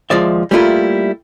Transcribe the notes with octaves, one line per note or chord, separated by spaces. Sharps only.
D#2 F3 G#3 D5 E5
G3 A3 A#3 D4 E4 F4